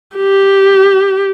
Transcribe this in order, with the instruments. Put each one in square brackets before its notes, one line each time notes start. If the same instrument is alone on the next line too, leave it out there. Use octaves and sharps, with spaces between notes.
[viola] G4